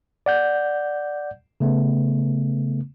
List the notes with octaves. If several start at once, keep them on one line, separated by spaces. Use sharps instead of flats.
D5 F#5 G6
C#3 A3 B3